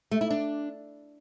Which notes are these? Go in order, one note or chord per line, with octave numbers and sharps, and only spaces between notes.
A3
E4
D4